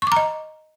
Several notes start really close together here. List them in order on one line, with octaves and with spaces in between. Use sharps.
C#6 D6 A#5 D#5